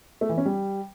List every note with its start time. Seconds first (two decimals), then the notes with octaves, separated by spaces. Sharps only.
0.21 A3
0.29 E3
0.37 C#4
0.46 G3